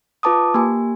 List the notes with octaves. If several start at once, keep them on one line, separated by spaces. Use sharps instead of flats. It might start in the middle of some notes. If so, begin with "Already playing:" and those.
F4 B4 A5 D6 D#6
A#3 G4 G#5